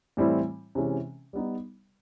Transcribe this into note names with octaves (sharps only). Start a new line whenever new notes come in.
A2 E3 G3 C4 E4
C3 E3 G#3 C#4
G3 B3 D#4